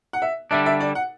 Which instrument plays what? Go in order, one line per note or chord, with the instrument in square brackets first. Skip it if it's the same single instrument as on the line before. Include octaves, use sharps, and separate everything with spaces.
[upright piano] F#5
E5
[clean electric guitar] D3 G3 D4 [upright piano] E5
[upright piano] E5
D5
F#5